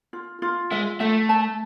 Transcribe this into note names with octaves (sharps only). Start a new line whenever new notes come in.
F4
F4
G#3 E5
A3 E5
A5